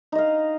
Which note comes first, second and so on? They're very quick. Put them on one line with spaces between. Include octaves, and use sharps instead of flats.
D#4 D#5 F5